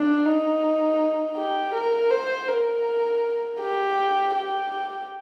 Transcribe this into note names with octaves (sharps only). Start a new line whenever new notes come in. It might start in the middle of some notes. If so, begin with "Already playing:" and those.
Already playing: D4
D#4
G4
A#4
C5
A#4
G4
G4